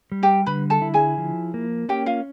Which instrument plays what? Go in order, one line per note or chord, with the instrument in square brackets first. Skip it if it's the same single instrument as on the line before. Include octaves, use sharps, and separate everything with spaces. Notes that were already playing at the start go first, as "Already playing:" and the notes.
[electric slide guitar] G3
[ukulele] G4 G5
[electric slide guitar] D3 [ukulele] B4 B5
[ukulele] A4 A5
[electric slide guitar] E4
[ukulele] G#4 G#5
[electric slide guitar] F3
A#3
[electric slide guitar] C#4 [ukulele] G4 G5
[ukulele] F4 F5